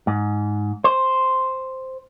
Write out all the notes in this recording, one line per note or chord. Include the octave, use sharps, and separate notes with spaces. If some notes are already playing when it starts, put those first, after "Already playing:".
G#2
C5